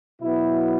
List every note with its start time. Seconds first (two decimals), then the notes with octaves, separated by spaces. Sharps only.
0.21 B2 F#3 B3 E4